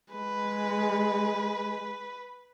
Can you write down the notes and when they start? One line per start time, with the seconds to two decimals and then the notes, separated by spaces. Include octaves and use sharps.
0.12 G#3 B4